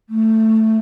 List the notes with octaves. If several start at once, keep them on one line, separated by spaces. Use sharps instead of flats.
A3